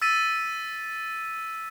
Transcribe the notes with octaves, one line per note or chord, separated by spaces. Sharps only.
E6 A6 B6 D#7